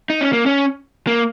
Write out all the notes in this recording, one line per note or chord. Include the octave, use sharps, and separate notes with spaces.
D#4
C#4
A#3
C#4
A#3